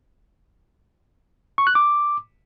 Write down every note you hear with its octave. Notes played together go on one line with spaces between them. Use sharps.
C#6
F#6
D6